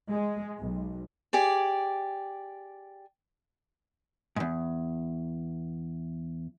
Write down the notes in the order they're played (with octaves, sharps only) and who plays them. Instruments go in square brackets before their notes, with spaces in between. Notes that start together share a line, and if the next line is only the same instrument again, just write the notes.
[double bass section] G#3
B1
[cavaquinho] G4 G#4 D5
[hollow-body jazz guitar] E2 G#2